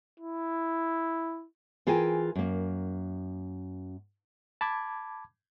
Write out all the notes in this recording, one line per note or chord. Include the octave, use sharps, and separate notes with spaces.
E4
E3 F4 G#4 A#4 G5 G#5
F#2 A#3
A5 B5 D6 G#6